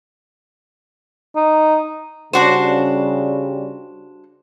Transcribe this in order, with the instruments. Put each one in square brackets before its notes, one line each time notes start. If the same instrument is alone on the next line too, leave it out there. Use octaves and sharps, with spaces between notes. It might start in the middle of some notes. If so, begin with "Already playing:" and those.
[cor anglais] D#4
[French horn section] C#3 G3 [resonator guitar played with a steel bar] D4 F#4 C5